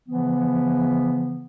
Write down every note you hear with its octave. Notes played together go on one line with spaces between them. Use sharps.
C#3 E3 F3 B3